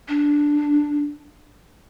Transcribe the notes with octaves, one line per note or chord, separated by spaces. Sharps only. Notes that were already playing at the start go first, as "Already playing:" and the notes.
D4